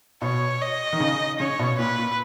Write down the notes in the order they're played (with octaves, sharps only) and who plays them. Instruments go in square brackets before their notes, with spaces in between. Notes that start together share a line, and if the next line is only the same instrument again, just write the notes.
[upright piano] B2 [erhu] C#5
[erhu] D#5
[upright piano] D#3
C#3
[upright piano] C#3 [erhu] C#5
[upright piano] B2
[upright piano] A#2 [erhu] B4
[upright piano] A#2